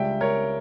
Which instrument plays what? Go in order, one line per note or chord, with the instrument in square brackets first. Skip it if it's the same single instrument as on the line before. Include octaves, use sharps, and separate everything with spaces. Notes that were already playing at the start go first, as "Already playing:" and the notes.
Already playing: [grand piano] C#2 C#3 G3 E5 G5
A#4 C#5